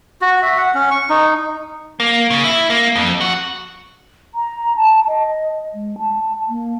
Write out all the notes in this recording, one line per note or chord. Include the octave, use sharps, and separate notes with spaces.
F#4
E5
F#5
C#4
C#6
D#4
A#3
C#3
E4
A#3
F2
F#4
A#5
A5
D#5
G#3
A5
A#3